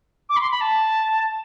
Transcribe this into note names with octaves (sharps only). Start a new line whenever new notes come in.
D6
B5
C6
B5
A5